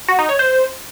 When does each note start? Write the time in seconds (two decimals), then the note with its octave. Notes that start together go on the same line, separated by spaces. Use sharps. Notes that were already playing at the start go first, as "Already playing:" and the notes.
0.08 F#4
0.19 D#4
0.29 C#5
0.39 C5